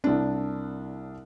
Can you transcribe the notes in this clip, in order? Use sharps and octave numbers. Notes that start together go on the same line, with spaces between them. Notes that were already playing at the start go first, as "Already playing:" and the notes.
C2 D4